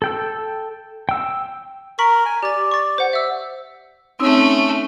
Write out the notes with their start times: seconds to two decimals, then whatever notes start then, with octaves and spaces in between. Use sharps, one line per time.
0.02 A4 G5 E6
1.09 G5 E6
1.99 A#4 C#6 B6 F#7
2.26 G#5
2.43 G4 D5 A6
2.71 C#6 A6
2.98 C5 F#5
3.13 E5 E6
4.20 A3 C4 C#4 D#4 E6